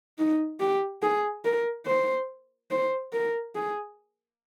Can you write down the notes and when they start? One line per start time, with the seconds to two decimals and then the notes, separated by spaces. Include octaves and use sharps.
0.18 D#4
0.60 G4
1.02 G#4
1.45 A#4
1.86 C5
2.71 C5
3.13 A#4
3.55 G#4